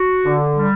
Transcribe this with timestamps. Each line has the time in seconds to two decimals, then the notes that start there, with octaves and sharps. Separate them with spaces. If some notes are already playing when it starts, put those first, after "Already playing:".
Already playing: F#4
0.25 D3
0.56 G3